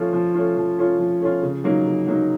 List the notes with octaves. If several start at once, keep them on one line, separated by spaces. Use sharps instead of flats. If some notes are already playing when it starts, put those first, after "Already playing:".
Already playing: F3 A3 C#4 F4
F3
A3 C#4 F4
F3
A3 C#4 F4
F3
A3 C#4 F4
C#3
F#3 A#3 D#4
C#3
F#3 A#3 D#4